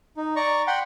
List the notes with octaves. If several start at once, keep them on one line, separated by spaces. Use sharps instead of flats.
D#4
D5 A#5 C#6
F#5 G5 B5 C6